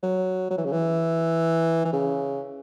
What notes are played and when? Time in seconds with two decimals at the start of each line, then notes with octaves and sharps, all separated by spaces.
0.03 F#3
0.51 F#3
0.58 E3
0.65 C#3
0.72 E3
1.85 E3
1.93 C#3